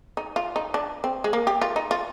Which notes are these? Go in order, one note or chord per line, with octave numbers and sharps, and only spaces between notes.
D#4
F4
D#4
D4
C4
G#3
A#3
G4
F4
D#4
F4